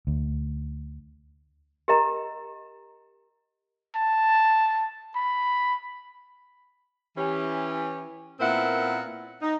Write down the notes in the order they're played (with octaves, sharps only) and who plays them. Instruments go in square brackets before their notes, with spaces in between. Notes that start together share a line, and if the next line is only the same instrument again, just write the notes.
[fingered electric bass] D2
[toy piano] G4 A#4 D#5 A#5
[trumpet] A5
B5
[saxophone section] E3 C#4 G4
A#2 B3 C4 E4 A#4 F#5
D#4